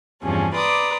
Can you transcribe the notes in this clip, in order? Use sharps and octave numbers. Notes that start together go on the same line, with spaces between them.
E2 G2 C3 F3 C#4 G#4
B4 D5 A#5 C6 D6 D#6